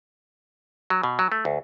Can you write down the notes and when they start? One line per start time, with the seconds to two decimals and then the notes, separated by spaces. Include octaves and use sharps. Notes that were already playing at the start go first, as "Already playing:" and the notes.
0.90 F#3
1.03 B2
1.19 F#3
1.32 A3
1.45 D2